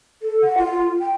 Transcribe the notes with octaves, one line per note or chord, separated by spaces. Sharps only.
A4
F#5
F4
G5